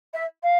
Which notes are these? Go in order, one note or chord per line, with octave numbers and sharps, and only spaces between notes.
E5
F5